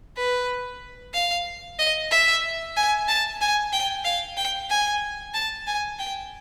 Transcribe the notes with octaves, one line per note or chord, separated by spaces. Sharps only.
B4
F5
D#5
E5
G#5
A5
G#5
G5
F5
G5
G#5
A5
G#5
G5